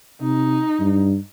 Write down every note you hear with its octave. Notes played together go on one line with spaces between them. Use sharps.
C3 D#4
G2